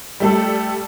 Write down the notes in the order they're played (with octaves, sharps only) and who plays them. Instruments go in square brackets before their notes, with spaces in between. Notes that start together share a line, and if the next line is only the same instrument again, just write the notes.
[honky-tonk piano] G3 A3 A4